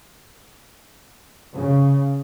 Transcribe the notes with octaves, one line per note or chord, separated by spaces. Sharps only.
C#3